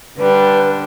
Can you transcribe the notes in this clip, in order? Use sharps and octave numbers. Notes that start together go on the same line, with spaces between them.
D3 G3 D4 B4